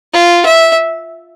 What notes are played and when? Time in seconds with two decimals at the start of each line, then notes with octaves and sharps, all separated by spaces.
0.13 F4
0.46 E5